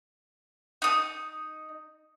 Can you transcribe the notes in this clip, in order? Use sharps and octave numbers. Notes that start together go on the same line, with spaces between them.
D#4 D#6